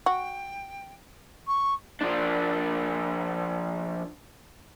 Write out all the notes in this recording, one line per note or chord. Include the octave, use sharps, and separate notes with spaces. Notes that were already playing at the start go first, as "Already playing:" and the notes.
F#4 G5
C#6
F3 D4